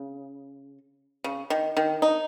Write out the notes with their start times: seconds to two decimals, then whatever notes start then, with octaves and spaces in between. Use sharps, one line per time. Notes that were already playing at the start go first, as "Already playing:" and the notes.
Already playing: C#3
1.24 C#3
1.50 D#3
1.77 D#3
2.02 D#4